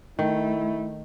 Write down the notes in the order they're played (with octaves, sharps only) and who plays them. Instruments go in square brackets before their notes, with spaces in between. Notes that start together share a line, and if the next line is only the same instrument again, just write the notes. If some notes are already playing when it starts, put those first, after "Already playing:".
[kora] D#3 [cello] A3 [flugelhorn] E4